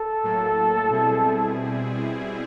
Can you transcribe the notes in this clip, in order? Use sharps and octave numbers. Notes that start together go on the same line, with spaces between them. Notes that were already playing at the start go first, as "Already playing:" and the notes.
Already playing: A4
A2 F#3 A#3
B2 G3 C4 E4 G#4